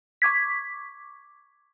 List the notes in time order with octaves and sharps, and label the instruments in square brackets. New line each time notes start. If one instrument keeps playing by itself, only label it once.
[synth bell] C#6 D6 G#6 B6